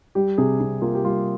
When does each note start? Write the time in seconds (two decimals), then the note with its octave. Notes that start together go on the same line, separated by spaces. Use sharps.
0.15 G3 G4
0.38 C3 G#4
0.60 C3
0.82 A#3 F4
0.95 G4
1.04 G3 F4